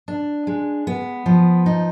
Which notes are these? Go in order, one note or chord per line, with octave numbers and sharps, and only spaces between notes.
D4
G#3
B3
F3
D#4